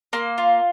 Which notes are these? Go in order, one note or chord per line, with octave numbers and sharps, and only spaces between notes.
A#3 C6
F4